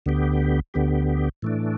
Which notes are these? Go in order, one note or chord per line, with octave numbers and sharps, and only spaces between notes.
D2 D3 B3 G4
D2 D3 B3 G4
A2 E3 A3 D4